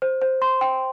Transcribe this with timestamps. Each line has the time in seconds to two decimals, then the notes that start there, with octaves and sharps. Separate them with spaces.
0.02 C5
0.22 C5
0.42 C6
0.61 G5